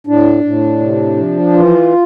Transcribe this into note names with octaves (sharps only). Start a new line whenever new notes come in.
A2 D4
A2
C3
F3
E3 F4